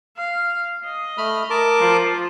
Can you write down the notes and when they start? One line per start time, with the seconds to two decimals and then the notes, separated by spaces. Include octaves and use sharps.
0.17 F5
0.85 D#5
1.18 A3 B5 F6
1.50 A#4 A5 D6
1.79 F3